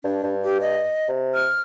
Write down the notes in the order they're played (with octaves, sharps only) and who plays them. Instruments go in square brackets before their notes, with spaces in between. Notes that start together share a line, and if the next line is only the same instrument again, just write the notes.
[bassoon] G2 [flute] D4
[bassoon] G2
[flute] G4
D#5
[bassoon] C3
[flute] F6